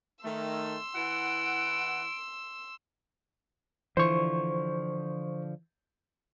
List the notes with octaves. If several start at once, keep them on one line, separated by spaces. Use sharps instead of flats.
D#3 A3 C6 E6
E3 E4 F#5 D7
D3 E3 F3 C5 C#6